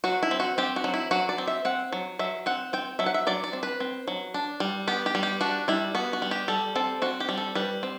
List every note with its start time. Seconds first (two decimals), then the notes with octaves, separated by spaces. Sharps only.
0.04 F#3 F#4
0.23 E4
0.31 C4
0.40 F#4
0.58 C4 G4
0.76 F#4
0.84 F#3
0.94 E4
1.11 F#3 F#4
1.29 D5
1.38 C4
1.47 E5
1.65 C4 F#5
1.93 F#3
2.19 F#3 E5
2.46 C4 F#5
2.73 C4 G5
2.99 F#3 E5
3.06 F#5
3.14 E5
3.27 F#3 D5
3.44 D5
3.53 C4
3.63 B4
3.80 C4
4.08 F#3
4.34 D4
4.60 G3
4.87 B3 G4
5.06 G4
5.15 G3
5.23 G4
5.41 D4 F#4
5.68 G3 E4
5.95 B3 F#4
6.13 F#4
6.22 G3
6.31 G4
6.48 G3 A4
6.76 C4 A4
7.02 C4 F#4
7.20 G4
7.29 G3
7.38 A4
7.55 G3 B4
7.83 C4